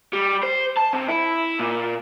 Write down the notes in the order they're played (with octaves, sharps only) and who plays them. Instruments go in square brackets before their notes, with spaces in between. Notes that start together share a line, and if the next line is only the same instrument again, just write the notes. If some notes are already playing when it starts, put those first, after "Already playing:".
[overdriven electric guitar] G3
C5
A5
C3
E4
A#2